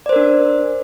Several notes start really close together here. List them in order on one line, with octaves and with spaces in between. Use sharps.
D5 C5 A#4 D4